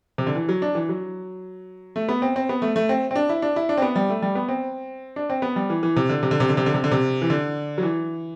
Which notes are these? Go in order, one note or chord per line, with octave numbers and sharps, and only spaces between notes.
C3
D3
E3
F#3
D4
E3
F#3
A3
B3
C4
C4
B3
A3
A3
C4
C4
D4
E4
D4
E4
D4
C4
B3
G3
A3
G3
B3
C4
D4
C4
B3
G3
E3
E3
C3
D3
C3
D3
C3
D3
C3
D3
C3
D3
C3
E3
D3
F#3
E3